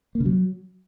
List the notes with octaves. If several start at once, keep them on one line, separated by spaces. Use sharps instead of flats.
A#3
C#3
F#3